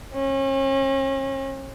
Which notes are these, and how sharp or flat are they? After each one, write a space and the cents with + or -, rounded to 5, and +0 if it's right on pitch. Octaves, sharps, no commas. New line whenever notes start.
C#4 -40